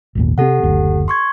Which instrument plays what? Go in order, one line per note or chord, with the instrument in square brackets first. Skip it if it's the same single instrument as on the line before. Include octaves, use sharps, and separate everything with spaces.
[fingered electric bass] G#1 D#2 A#2
[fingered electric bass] C3 C4 [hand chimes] G4 A4 F#5
[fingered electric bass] F#1 D2
[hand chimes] C6 C#6 G#6